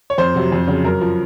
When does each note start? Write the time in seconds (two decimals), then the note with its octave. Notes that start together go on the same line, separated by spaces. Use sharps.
0.10 C#5
0.18 F2 C5
0.35 C3 F#3
0.52 F2
0.68 C#3 F#3
0.85 F#2 A#4
1.01 F3